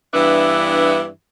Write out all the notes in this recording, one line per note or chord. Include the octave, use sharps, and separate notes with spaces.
G2 E3 B3 D4 E5